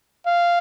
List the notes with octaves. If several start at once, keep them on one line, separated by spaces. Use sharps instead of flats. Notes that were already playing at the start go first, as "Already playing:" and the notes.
F5